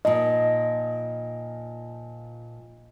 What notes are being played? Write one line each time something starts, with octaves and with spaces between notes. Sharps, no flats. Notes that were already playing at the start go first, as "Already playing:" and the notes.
A#2 F3 D#5